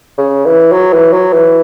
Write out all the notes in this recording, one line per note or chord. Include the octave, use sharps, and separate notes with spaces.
C#3
E3
F#3
E3
F#3
E3